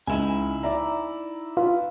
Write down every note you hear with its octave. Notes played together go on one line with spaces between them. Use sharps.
C#2 D#4 E4 G#5
D5 E5 A#5
F4 B4